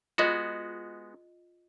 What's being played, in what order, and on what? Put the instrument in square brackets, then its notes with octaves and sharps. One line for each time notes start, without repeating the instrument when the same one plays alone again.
[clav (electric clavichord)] G#3 B3 F#4 [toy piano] F4 G#4 D#5